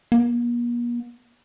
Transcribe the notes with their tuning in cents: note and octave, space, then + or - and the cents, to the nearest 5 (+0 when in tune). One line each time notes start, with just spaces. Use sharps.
A#3 +45